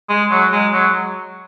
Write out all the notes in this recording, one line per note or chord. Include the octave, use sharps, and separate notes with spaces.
G#3
F#3
G#3
F#3